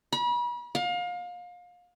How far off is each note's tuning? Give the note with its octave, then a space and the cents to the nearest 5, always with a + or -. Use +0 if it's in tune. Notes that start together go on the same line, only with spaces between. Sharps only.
B5 -40
F5 +30